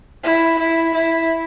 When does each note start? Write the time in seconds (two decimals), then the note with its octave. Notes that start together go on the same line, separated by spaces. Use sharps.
0.24 E4
0.59 E4
0.94 E4